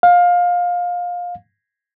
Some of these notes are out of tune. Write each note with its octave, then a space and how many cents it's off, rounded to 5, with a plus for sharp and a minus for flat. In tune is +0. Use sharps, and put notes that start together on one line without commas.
F5 +20